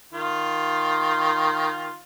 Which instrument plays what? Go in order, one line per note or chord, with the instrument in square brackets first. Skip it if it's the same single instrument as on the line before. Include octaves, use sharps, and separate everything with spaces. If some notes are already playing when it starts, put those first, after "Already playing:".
[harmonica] D#3 F4